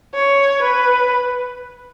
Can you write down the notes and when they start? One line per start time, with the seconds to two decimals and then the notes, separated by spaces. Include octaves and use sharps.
0.14 C#5
0.62 B4